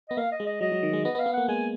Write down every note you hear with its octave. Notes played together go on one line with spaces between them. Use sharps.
B3 D#5
A#3 F5
D#5
G#3
D#5
F#3 D#5
F#3
D#3
G#3
B3 D#5
B3
F5
B3
A#3 F#5
G#3 G#5